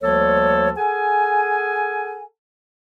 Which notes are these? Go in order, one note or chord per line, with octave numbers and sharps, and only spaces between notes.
D2 F3 G3 A#3 A4 C#5
G#4 A4 F#5 G#5